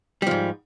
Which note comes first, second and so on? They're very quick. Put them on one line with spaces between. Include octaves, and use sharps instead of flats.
G3 F3 G#2